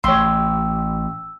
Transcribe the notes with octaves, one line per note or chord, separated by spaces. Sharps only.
A1 G4 C#5 C6 E6